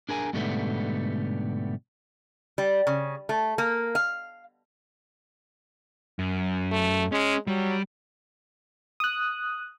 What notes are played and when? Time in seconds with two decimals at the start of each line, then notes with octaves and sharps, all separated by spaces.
0.09 D4 G#4 A#4 G#5
0.33 G#2 B2 D3 G3 A3 B3
2.58 G3
2.87 C#3
3.29 A3
3.58 A#3
3.95 F5
6.19 F#2
6.72 A3
7.12 G#3 C#4
7.47 F#3 G3
9.00 D#6 F#6